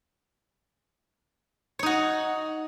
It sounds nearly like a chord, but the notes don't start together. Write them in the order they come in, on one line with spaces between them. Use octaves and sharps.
C#5 D#4 F#4